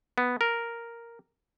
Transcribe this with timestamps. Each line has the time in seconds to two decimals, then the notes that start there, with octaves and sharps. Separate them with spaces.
0.18 B3
0.41 A#4